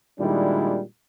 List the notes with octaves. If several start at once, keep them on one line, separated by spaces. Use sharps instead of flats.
A#2 D#3 G3 G#3 D4 E4